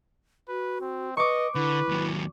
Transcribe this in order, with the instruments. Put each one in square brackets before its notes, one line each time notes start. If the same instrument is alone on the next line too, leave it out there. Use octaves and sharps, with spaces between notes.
[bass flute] F#4 [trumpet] B4
[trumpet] C4
[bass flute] B4 [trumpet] D#5 [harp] C#6 D6
[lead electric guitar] D3 [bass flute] E4 [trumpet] B4
[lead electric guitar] D#2 F#3